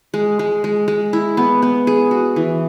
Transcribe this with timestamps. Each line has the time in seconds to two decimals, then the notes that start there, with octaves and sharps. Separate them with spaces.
0.14 G#3
0.39 G#3
0.64 G#3
0.88 G#3
1.13 E4
1.37 B3
1.62 B3
1.87 G#4
2.11 F#4
2.36 E3